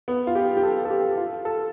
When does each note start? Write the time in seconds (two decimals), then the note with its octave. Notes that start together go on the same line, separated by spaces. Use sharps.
0.08 B3
0.27 F4
0.35 G4
0.57 G4
0.63 A4
0.85 A4
0.90 G4
1.17 F4
1.45 A4